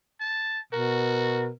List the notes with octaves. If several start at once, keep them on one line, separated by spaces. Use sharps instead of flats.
A5
B2 F#4 A#4